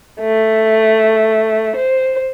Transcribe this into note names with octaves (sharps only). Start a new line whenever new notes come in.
A3
C5